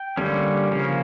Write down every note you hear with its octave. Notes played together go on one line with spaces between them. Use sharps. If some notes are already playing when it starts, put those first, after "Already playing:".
Already playing: G5
D3 G3 A#3 C#4
C#3 F3 A#3 C#4